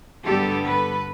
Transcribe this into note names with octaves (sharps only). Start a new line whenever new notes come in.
G2 D3 G3 B3 G4 A4
A4 B4